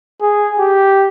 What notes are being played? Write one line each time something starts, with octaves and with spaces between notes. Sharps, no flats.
G#4
G4